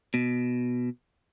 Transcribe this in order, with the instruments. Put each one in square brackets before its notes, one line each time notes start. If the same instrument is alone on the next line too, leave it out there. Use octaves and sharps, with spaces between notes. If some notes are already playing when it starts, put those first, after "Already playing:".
[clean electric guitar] B2